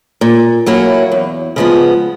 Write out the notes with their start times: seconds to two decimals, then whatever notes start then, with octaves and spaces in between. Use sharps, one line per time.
0.21 A#2
0.66 F#3 A#3 C#4 E4
1.12 E2
1.56 C#3 F3 G#3 B3